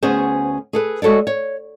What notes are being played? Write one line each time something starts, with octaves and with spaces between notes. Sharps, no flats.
D2 B3 C#4 G#4 C5
G#4 A4 B4
G#3 F#4 A4 C#5 D5
C#5